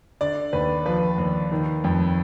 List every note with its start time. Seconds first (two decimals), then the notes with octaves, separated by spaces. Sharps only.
0.21 D3 D5
0.53 D#2 B4
0.86 F3 B4
1.18 D#2
1.52 D#3
1.84 F2